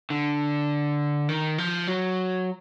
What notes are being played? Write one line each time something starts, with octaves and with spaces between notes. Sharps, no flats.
D3
D#3
F3
F#3